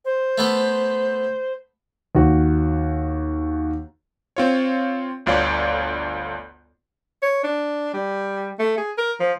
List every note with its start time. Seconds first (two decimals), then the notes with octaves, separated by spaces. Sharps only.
0.05 C5
0.38 A3 B3 A4
2.15 D#2 F#4
4.37 C4 F4 C#5
5.26 G1 D2 F4 C#5 D5
7.22 C#5
7.44 D4
7.94 G3
8.59 A3
8.78 G#4
8.98 A#4
9.20 F3